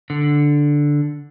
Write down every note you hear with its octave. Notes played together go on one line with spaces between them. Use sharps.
D3